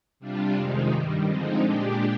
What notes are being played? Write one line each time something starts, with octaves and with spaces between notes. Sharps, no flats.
C3 G3 D4 F4
F2 C3 D#3 G#3 D#4
G2 D#3 G3
D3 F3 G#3 C4 D#4
A#2 G#3 D4 G4